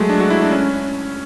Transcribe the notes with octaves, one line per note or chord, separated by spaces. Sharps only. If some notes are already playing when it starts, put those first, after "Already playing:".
Already playing: F#3 G#3 A3
D4
F#4
E4
D4
C#4